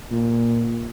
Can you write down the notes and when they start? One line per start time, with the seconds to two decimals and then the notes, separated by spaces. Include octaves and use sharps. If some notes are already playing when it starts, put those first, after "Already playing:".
0.11 A#2